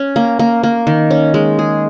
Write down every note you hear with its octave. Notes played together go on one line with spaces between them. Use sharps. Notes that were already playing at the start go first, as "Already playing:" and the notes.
Already playing: C#4
A#3
A#3
A#3
D#3
C#4
G#3
G#4